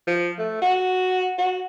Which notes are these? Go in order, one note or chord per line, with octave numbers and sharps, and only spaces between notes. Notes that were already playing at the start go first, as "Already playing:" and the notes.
F3
A3
F#4
F#4